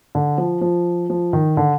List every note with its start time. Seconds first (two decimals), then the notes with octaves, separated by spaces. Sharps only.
0.15 D3
0.38 F3
0.61 F3
1.10 F3
1.33 D#3
1.57 D3